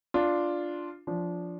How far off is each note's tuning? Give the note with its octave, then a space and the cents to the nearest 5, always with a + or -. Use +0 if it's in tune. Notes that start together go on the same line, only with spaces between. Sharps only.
D4 +0 F4 +0
F3 +0 D4 -20